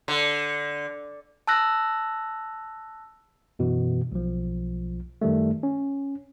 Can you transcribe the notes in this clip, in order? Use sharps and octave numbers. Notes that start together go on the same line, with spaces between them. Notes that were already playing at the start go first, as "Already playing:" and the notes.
D3
A5 E6 F#6 A#6
F#2 B2 E3
B1 F3
F#2 D#3 G3 A3
C#4